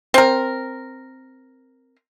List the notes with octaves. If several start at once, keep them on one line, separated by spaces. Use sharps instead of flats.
C4 A#4